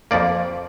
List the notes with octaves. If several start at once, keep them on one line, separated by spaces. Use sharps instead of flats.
F2 F3 A#3 D5